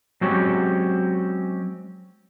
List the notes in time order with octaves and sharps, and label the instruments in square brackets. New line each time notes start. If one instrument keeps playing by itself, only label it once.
[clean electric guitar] F#3 G#3 C4 C#4 F#4 G4